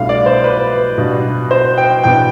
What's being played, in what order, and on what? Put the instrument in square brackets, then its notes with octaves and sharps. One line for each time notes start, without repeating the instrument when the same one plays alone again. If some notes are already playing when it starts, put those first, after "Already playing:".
Already playing: [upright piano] C2 B2 A3 D4 F4 F5
D5
C5
B4
B2 G3 D4 F4
C5
G5
E2 B2 B3 D4 G5